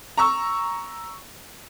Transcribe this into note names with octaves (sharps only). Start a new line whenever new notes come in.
A#5 C#6 E6